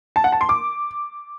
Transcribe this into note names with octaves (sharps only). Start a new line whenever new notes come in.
A5
F#5
A5
C6
D6